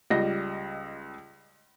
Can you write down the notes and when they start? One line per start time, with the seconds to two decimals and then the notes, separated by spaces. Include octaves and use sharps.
0.10 C#2 G3 D#5 A#6